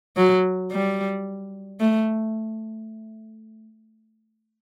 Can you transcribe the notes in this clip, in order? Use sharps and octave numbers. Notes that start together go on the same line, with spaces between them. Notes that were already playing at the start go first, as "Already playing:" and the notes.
F#3
G3
A3